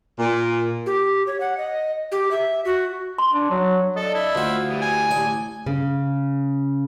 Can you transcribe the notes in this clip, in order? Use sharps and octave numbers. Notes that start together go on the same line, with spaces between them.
A#2
G4
C#5
F#5
D#5
G4
E5
F#4
C6
D4
F#3
D4 A4 D#5
E4
D2 F4 F#4 C5
E3 G3 D#6
G#5
A1 D5
C#3